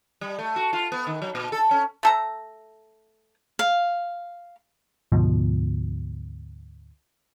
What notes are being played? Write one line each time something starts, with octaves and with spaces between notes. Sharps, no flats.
G3
A3
F#4
F4
B3
D#3
F#3
A#2
A4
C#4
A3 A4 A#5
F5
D2 G#2 B2 F3